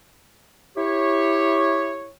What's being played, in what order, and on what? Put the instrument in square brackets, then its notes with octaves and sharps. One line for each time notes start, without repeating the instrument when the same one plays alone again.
[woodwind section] E4 G4 C#5